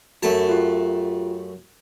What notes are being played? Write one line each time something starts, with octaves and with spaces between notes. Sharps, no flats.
F#2 A3 F#4 A5
F4 G4